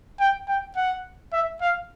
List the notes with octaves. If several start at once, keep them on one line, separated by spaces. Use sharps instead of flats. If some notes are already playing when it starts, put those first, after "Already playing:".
G5
G5
F#5
E5
F5